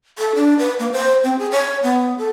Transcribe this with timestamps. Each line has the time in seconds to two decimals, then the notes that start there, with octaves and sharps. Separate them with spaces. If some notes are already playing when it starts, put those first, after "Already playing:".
0.18 A4
0.35 D4
0.59 B4
0.79 A#3
0.92 C5
1.24 C4
1.39 G#4
1.52 C#5
1.83 B3
2.18 A4